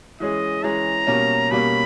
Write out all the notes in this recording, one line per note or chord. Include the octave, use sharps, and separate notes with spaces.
E3 G#3 C#4 G#4 D#5
E3 G#3 C#4 G#4 A#5
B2 G3 A#3 C#4
B2 G3 A#3 C#4 B5